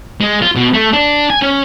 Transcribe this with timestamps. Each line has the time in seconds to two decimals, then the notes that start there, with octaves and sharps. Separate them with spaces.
0.21 G#3
0.42 F4
0.56 B2
0.74 A3
0.93 D4
1.30 G#5
1.42 C#4